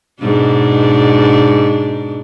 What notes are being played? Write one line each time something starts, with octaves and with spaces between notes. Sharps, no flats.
G#2 B2 D4